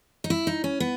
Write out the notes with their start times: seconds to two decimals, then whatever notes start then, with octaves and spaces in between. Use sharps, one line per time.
0.24 D#4
0.30 E4
0.47 D#4
0.64 C#4
0.80 B3